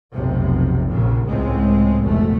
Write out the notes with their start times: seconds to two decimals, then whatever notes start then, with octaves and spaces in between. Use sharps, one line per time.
0.14 F1 B1 C3
0.87 A#1 A#2 C#3
1.26 C#2 A2 G#3 C4
2.03 F1 C2 B2 A3